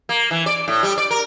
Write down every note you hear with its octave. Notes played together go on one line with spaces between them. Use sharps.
A#3
E3
D5
A2
G3
D5
A#4